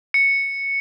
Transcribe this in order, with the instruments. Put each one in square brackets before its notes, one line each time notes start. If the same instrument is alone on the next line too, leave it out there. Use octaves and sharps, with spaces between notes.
[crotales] C#7